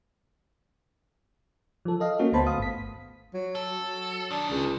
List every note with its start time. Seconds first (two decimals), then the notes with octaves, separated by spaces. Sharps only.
1.85 F3 A4
2.00 A4 D#5 F5
2.19 A#3 C#4 F#4
2.33 D2 A3 B3 C5 A5 B5
2.46 F5 D#6
2.58 G#1 B6
3.34 F#3
3.55 A4
3.77 F#3
4.31 D2 D#3 D4
4.50 C#2